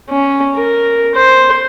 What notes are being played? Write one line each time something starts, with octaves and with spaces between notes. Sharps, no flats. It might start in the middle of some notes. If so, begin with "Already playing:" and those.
C#4
A#4
C5